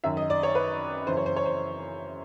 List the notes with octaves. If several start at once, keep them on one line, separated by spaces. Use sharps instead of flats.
F#2 D#3 E5
D#5
D5
C#5
B4
F#2 C#3 E3 C5
C#5
C5
C#5
C5